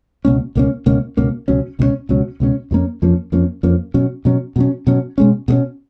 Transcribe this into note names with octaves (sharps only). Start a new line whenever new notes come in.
C#2 B2 A#3 C#4
C#2 B2 A#3 C#4
C#2 B2 A#3 C#4
C#2 B2 A#3 C#4
C#2 B2 F#3 C#4
C#2 B2 F#3 C#4
C#2 B2 F#3 C#4
C#2 B2 F#3 C#4
F2 F3 A#3 C#4
F2 F3 A#3 C#4
F2 F3 A#3 C#4
F2 F3 A#3 C#4
B2 F#3 C#4
B2 F#3 C#4
B2 F#3 C#4
B2 F#3 C#4
B2 G#3 C#4
B2 G#3 C#4